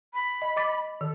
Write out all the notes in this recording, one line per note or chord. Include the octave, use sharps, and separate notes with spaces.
B5
D#5
D#5 D6 A6
D#3 A4